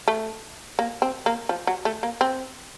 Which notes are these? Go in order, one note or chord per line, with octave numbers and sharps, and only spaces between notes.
A3
A#3
C4
A#3
F3
F#3
A3
A#3
C4